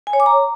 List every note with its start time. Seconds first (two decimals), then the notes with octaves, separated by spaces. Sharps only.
0.07 G#5
0.13 C#5
0.20 D6
0.26 A#5